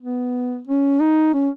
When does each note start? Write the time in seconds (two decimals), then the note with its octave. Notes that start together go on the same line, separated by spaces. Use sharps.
0.02 B3
0.68 C#4
1.01 D#4
1.34 C#4